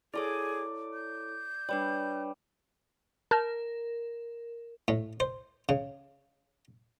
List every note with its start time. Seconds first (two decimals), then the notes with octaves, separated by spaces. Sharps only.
0.14 E4 G#4 A4 C#5 D5 D6
0.94 G6
1.69 G3 D4 B4 C#5
3.31 A#4 A5 F6 G6
4.88 A2
5.20 C5
5.69 C#3